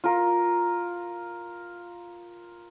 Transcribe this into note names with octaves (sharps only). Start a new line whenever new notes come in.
F4 A#4